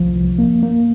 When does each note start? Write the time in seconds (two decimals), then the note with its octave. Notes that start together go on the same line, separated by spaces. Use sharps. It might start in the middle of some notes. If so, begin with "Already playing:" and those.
Already playing: C2 F3
0.15 C2
0.39 A#3
0.63 A#3